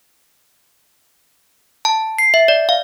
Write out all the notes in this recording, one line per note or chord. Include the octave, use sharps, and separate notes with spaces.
A5
C7
E5
D5
F5